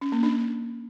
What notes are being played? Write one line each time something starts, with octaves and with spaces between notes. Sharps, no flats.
C#4
A#3
D4